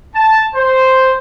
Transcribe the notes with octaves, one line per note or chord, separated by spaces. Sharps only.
A5
C5